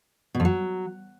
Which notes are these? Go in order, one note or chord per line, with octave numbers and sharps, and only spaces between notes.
B2
F2
F#3